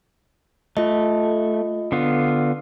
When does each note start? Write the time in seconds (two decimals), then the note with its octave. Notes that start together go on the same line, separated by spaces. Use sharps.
0.77 A3 F4 D#5
1.92 D3 B3 F4